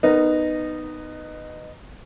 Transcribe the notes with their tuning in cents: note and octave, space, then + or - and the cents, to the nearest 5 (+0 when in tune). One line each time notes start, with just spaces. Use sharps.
B3 +15 D#4 -15 A#4 +0